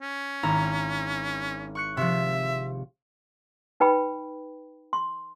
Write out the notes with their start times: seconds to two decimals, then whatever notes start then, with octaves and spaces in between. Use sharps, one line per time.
0.01 C#4
0.43 G#1 E4 A#5
1.75 C#6 F#6 C#7
1.97 C3 F3 E5
3.80 D#4 B4 G5 B5
4.93 C6